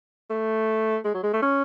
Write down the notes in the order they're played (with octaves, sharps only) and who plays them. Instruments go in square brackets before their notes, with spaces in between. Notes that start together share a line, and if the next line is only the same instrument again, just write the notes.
[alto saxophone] A3
G#3
F#3
G#3
A3
C#4